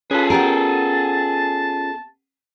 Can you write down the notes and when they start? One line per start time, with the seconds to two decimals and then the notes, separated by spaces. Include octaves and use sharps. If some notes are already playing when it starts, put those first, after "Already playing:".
0.11 C#4 F4 G#4 A4 B4
0.30 B3 G4 A#4 A5